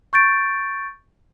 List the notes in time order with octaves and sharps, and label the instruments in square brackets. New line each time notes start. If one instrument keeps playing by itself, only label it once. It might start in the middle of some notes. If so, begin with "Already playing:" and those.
[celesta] C#6 G6 A6 D7